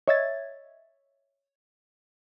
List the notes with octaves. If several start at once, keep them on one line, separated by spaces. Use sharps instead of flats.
C#5 D#5 E5 G#6 A6